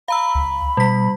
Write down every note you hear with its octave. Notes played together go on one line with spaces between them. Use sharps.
F5 A#5 B5 E6
C#2
B2 G3 B6